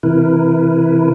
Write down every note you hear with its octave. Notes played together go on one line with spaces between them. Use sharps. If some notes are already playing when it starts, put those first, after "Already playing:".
C3 E3 E4 A#4 B4